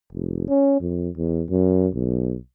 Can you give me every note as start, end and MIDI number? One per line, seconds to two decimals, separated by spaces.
0.12 0.46 29
0.49 0.78 61
0.81 1.09 41
1.17 1.44 40
1.49 1.88 42
1.94 2.36 35